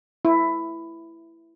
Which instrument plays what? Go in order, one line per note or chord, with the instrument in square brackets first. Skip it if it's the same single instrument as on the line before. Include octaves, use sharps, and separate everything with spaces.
[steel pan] E4